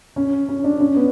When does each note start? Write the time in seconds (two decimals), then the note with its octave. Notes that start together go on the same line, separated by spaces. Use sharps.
0.16 C#4
0.48 C#4
0.64 D4
0.80 C#4
0.96 B3